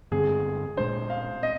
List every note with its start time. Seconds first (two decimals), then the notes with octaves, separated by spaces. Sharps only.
0.11 G2 D3 G#3 C4 G#4
0.77 A#2 G#3 D4 C5
1.10 F5
1.43 D#5